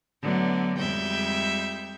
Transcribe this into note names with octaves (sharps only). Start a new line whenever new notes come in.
D3 F#3 A3 B3 D5
F2 G3 G#3 E5 G5 G6